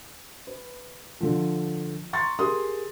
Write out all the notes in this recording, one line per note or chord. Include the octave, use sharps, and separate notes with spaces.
B4
D3 F3
A#5 C6 C#6 A6
G4 G#4 A#4 C6 D#6